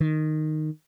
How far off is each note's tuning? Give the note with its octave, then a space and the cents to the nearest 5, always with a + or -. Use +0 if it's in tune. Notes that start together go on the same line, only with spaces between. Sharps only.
D#3 -10